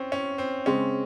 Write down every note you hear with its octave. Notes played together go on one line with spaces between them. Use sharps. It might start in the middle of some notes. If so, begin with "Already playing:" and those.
Already playing: C4 C#4
C#4
C4
C#3 G#3 C4 C#4